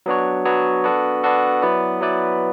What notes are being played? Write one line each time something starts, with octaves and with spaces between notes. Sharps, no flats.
F#3 B3 D4 F#4 C#5
F#3 B3 D4 F#4 C#5
B3 D4 F#4 A4
B3 D4 F#4 A4
F#3 B3 E4 B4 D5
F#3 B3 E4 B4 D5